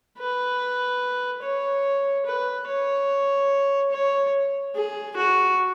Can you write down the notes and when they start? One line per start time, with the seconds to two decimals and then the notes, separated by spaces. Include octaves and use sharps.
0.19 B4
1.43 C#5
2.26 B4
2.68 C#5
3.92 C#5
4.75 G#4
5.16 F#4